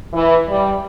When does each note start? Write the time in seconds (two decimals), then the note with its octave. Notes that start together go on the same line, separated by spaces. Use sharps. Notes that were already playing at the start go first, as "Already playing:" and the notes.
0.13 E3
0.48 G3